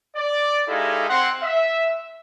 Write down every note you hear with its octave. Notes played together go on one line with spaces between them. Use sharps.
D5
G#3 D#4 E4 G4 A4 F5
C4 F#5 C6
E5